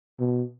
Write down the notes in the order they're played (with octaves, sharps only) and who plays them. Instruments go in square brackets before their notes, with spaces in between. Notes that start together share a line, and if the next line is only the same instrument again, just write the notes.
[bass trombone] B2